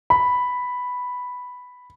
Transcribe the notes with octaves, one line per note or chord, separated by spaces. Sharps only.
B5